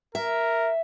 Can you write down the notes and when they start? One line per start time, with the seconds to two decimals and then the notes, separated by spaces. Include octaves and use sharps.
0.15 A#4 E5